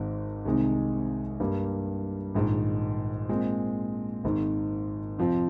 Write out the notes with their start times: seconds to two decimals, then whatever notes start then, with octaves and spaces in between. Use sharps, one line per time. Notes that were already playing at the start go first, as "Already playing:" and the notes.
Already playing: G#1 G#2 D#3
0.45 C2 C3 D#3 G#3 D#4
1.40 G2 G3 A#3
2.35 A#1 G#2 D#3
3.29 A#2 G#3 C4
4.24 G#1 G#2 D#3
5.18 F2 C3 F3 C4 F4